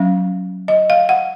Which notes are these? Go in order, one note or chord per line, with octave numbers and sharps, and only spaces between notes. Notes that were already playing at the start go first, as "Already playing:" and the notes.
Already playing: F#3 C#4 F5
D#5
F5
F#5